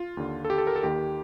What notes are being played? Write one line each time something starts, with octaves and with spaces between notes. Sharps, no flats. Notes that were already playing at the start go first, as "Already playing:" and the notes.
Already playing: F4
D#2 D3
A4
G4
A4
A#4
A4
D#2 D#3 G4